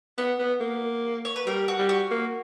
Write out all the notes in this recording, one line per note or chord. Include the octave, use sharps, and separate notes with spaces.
B3 F#5
B3
A#3
C#5
B4
G3 A#4
F#4
G3
F#4
A#3